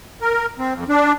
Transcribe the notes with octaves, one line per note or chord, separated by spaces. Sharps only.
A#4
C4
F2
D4